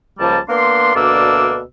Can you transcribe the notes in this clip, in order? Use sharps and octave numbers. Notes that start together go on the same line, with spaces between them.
C#2 F3 G3 A#3 A5
A#3 B3 D4 C6
D2 B2 A#3 D4 D5 E6